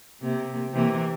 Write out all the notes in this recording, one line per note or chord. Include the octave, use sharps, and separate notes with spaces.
C3 A#3
C3 E3 A#3